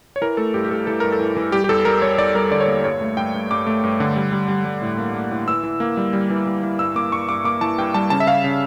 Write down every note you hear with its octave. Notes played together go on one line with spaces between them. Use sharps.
C#5
E3 A#4
A3 A4
G2 G4
G4
G2 A4
E3 A4
G2 A#4
A4
E3
E3
G3 G4
G4
E2 A4
G3 A#4
G3 C#5
E2 D5
G3 A#4
D3 D5
C#5
A#3 D5
G2 C#5
A3
G2 G5
G2
G2 D6
A3
G2
D3
G3
G3
G3
G3
A2
A#3
A#3
A2
E3 E6
E3
A#3
G3
G3
E3
G3
E3
G2 E6
A#3 D6
G2 C#6
G2 D6
A#3 D6
E3 A5
G2 G5
G3 A5
C#3 A5
E5
C#3 F5
C#3